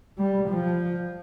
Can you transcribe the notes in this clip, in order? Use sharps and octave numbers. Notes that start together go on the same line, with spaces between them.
G3
F3